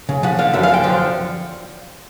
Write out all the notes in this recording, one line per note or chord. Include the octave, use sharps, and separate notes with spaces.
C#3
F3 F#5
D3 F5
F#2 E5
F5
D3
G5
F3